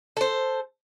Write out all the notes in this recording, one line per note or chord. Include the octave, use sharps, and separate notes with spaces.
A4 C5